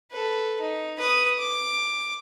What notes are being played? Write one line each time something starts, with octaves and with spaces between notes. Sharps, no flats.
A4 B4
D#4
B4 D#6
D6